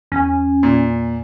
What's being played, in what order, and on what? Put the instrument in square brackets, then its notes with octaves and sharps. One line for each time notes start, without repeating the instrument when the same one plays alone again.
[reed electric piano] E2 G#5 [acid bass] C#4
[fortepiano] A#2